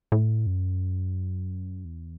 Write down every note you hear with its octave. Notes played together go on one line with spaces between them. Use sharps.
A2
F#2
E2